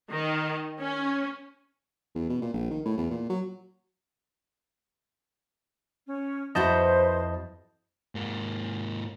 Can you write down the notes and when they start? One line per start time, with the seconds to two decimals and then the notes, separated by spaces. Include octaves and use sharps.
0.10 D#3
0.80 C#4
2.15 E2
2.29 B2
2.41 A#2
2.53 A#1
2.70 D#3
2.85 A2
2.97 E2
3.10 A#2
3.30 F#3
6.07 C#4
6.55 F2 E4 F#4 B4 C5 D#5 A5 G6
8.15 G#2 A#3